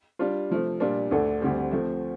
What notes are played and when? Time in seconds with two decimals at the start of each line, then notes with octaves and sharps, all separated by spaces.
0.19 G3 D4 F4
0.50 C3 F3 A3
0.80 A#2 G3 D4 F4
1.11 D2 D3 A3 D4 A4
1.41 D2 D3 G3 C4 G4
1.71 F3 A3 C4